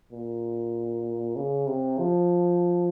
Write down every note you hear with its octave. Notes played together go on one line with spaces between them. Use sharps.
A#2
C#3
C3
F3